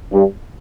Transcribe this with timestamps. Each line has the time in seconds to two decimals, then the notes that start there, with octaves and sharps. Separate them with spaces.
0.13 G2